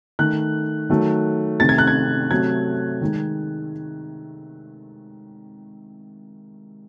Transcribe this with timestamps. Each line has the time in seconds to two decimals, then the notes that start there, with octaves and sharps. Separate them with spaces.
0.19 D#3 A3 F#6
0.90 D#3 F#3 A3
1.60 C3 D#3 A3 A6
1.69 G#6
1.78 F#6
1.87 G#6
2.31 C3 F#3 A3 G#6
3.01 D#3 G#3